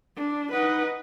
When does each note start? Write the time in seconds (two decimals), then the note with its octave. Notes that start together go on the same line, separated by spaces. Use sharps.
0.16 D4
0.52 D#4 B4 D#5 F#5